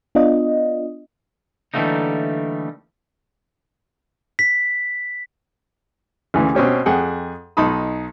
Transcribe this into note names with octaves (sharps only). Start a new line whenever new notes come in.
B3 D4 F4 D#5
D3 E3 G3 A3 A#3 D#4
B6
D2 C#3 E3
B2 C4 C#4 G4
F2 G#4 F#5 G5
B1 D#4 A5 B5 D#6